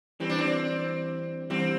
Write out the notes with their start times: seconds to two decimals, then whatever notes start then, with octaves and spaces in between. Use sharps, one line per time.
0.20 E3 G3 C4
0.30 D4
0.38 C4
1.50 E3 G3 C4